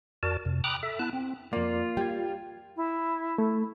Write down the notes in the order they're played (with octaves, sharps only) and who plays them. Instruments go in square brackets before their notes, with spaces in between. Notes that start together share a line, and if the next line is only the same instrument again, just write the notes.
[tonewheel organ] F2 F#4 A#4 D5 A5
F2 C3
G5 A#5 B5 D6 D#6 F#6
A4 E5
B3 E4 A5 F#6
C4
[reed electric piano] F2 D5 [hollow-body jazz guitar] A#3 [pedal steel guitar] F4
[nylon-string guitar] G3 [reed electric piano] G5 G#6
[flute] E4
[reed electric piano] A3